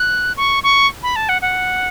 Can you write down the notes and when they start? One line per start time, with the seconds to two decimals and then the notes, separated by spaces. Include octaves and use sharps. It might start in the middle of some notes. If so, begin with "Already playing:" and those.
Already playing: F#6
0.37 C#6
0.63 C#6
1.03 B5
1.16 A5
1.29 F#5
1.42 F#5